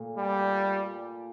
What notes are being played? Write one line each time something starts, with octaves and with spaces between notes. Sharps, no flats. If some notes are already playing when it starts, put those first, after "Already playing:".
Already playing: A#2 A3
G3